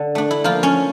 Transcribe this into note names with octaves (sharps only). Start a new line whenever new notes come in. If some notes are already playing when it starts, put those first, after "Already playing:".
Already playing: D3
A3 D4
E4
F3 A#3 F4
C#4 C#5